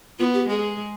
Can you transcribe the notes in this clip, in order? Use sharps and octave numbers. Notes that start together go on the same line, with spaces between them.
B3 F4
G4
G#3 G#4